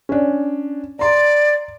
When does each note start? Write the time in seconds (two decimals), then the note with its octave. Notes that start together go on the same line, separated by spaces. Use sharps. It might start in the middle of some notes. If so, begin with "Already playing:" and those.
0.09 C#4 D4
0.99 D5 A#5 C6